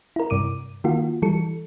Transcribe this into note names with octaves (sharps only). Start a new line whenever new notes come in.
E4 A#4
G2 C3 D6 D#7
D#3 A#3 F4 F#4
E3 G3 A4 C#7